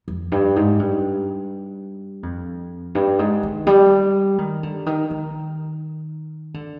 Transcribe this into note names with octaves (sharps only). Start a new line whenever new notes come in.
F2
G2
G#2
G2
F2
G2
G#2
D#3
G3
D#3
D3
D#3
D#3
D3